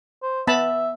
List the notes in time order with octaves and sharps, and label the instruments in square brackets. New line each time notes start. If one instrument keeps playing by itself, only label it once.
[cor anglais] C5
[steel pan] B3 A5 B5 [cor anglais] E5